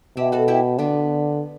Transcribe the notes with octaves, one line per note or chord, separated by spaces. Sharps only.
B2 E4 G4
F#4 A4
E4 G4
D3 B3 D4